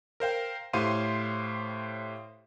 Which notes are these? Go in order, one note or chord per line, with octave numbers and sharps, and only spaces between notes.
A#4 C5 F5 G5
A2 G4 C5 F5 C6 D#7